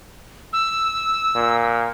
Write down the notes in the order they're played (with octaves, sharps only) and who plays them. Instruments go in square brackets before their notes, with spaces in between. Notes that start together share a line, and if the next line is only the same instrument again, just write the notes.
[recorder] E6
[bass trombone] A#2